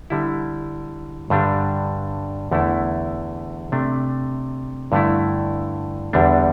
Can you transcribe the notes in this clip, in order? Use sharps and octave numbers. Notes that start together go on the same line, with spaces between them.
D3 G3 E4
G2 D3 G3 D4
E2 D3 A3 E4
C3 A3 D4
G2 D3 A3 E4
E2 D3 G3 D4